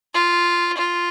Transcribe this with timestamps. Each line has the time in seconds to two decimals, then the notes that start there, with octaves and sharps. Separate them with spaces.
0.14 F4
0.78 F4